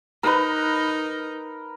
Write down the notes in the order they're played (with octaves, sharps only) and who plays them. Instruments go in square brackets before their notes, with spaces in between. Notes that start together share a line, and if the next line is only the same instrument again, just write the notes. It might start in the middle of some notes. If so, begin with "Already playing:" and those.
[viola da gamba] D#4 [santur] A#4 B4